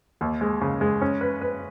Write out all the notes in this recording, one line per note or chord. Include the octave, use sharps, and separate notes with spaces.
D#2
G#3
C#3
G#3
C#4
B4
B4